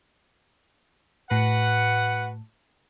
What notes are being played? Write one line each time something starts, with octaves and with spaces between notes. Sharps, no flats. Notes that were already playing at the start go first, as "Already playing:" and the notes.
A2 F#4 B4 F#5